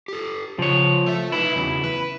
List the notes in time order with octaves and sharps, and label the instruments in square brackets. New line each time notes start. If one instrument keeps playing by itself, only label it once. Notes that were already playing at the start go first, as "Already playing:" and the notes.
[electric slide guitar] G4 A4
[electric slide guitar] C#3 [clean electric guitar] F3 C#5
[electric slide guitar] A3 E5
[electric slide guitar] D#4 B4 [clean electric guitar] E4
[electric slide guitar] E2 C#3 F#3
B4